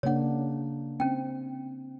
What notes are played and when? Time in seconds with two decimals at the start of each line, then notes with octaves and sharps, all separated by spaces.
0.03 C#3 A#3 D4 C#5 F#5
1.00 C4 C#4 G5